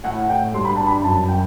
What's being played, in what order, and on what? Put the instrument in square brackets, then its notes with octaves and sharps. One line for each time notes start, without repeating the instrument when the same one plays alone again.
[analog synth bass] A2 [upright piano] F#5
[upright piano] G5
[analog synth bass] G2 [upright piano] C6
[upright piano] B5
A5
B5
[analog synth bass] F#2 [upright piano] A5
[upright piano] G5